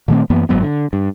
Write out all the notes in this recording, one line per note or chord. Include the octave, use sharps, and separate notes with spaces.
A#2 D#3 A3 C4
F#2 E3 A#3 B3
G1 G#2 F#3 B3
D3
G2